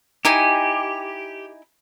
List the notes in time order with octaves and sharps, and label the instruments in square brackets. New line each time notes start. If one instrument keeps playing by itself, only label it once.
[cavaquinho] D#4 E4 G#5 [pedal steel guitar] G4